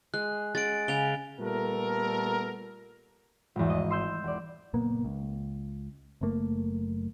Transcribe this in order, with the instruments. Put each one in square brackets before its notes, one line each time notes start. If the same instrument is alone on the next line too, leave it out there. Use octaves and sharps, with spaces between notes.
[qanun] G#3 [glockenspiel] F#6
[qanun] G#3 C#4 F#5 [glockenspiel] A6 D7
[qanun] C#3 [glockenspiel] G#5 F7 G7
[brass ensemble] A#2 G3 A3 B3 A4 A#4
[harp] G#1 E2
D#5
C6 E6 G6
E1 D5
[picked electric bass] F#1 A#2 A#3 B3
C#2
F#1 F#2 A3 A#3